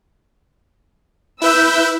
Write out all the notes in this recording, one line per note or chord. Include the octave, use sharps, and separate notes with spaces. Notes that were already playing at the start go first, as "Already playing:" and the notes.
E4 B4 E5 E6 G6